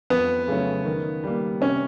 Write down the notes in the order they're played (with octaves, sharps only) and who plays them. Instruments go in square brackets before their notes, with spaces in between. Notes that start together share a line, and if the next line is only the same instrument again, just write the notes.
[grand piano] F2 [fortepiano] B3
[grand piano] C#3 F#3 A3 C#4
D#3
G3 A#3
[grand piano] C3 [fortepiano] C#4